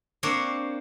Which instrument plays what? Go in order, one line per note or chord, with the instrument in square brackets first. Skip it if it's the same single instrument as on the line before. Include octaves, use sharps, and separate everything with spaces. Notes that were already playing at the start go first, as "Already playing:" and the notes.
[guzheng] A#3 C4 D4 C5 C#5